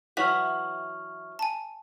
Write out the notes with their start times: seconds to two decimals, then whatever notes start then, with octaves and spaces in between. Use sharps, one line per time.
0.17 E3 F#3 F#4 E5 C#6 F6 B6
1.39 G#5 A5